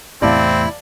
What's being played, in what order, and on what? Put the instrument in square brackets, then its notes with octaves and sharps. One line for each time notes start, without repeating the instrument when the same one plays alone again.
[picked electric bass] E2 A2 C3 [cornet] C4 [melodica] E4 [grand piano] D5 F5 A5